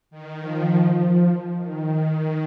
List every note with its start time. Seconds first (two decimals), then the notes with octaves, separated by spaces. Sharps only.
0.11 D#3
0.40 F3
1.57 D#3